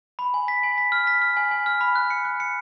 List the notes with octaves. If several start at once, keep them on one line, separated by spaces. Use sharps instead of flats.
B5
G#5
B6
G#5
B6
F6
B6
F6
G#5
G#5
F6
B5
F#6
C#7
F#6
C#7